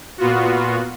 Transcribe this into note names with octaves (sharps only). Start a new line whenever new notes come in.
A#2 B3 F4 F#4